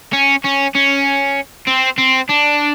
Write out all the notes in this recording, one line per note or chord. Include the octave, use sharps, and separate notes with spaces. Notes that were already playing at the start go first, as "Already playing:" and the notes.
C#4
C#4
C#4
C4
C4
D4